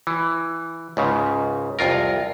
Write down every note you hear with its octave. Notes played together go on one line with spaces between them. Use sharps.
E3
C#2 G#2 C#3
C2 F2 F4 A#4